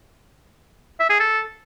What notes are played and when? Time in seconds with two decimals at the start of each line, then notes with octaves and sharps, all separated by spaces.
1.00 E5
1.10 G#4
1.20 A4